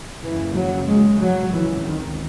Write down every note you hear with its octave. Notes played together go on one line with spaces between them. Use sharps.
F#1 F#2 C#3 E3
F#3
G#3
F#3
C#2 C3 E3
D#3